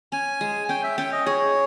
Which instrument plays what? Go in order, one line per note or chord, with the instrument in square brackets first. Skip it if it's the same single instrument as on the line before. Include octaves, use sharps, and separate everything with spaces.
[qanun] C#4 [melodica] G#5
[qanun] G#3
[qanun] C#4 [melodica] G5
[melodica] E5
[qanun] C#4 [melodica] G5
[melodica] D#5
[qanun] G#4 [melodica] C#5